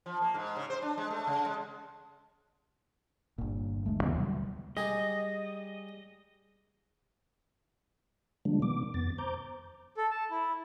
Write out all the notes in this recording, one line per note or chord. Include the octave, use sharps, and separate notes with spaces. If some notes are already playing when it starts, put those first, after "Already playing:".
F3
A#3
G#2
C#3
C5
D4
G#3
A3
C#3
G#3
G1 A#2
D2 G#3 A3
D#2 C#3 E3 B3
D2 B2 F#3 G3
G3 G#4 D#5
D3 F3 G3 G#3 A#3 D4
B2 D#3 B3 D6
F2 B3 A6
C5 A#5 D6 G6
A4
A5
E4